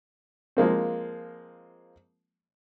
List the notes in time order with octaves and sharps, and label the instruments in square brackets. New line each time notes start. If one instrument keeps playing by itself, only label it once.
[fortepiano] F3 G#3 A#3 C4